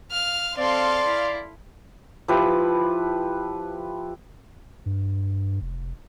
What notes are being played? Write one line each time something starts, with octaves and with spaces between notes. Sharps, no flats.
F5 F6
C4 A4 D5 F5 C6
E4
F3 E4 G4 B4
G2
F1